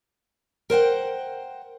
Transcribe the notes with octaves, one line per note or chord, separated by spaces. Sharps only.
A#4 C5 F#5 G5